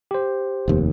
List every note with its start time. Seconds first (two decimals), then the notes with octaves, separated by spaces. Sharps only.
0.11 G4 C5
0.68 F1 D#2